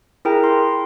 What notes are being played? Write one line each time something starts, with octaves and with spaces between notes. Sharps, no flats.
E4 G#4 A#4 G5 A#5
C6